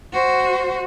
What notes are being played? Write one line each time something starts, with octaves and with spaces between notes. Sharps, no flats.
F#4 C5